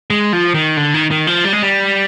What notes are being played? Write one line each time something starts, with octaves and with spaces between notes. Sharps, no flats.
G#3
F3
D#3
D3
D#3
D#3
F3
G3
G#3
G3